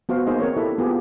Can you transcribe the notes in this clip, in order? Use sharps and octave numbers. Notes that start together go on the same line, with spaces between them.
B3 F#4 C5 F5
A#3 B3 D#4 G#4 C5 D#5
C4 A#4 C#5
E4 G4 A4 B4 D#5 E5
B3 F4 G4 G#4